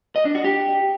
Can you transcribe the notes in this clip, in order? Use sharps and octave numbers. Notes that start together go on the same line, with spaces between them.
D#5
D4
F#4
G4